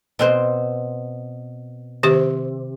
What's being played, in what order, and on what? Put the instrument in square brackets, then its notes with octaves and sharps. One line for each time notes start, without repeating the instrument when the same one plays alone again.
[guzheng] B2 C4 C5
[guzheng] C3 [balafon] D#3 G4 C5